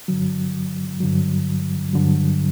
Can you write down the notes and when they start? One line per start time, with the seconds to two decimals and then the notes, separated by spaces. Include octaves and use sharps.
0.08 G2 D3 F#3
1.00 G2 D3 F#3
1.93 G2 D3 F#3